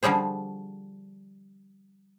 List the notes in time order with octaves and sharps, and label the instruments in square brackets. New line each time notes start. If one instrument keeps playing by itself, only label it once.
[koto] D3 F3 G3 G#4 C5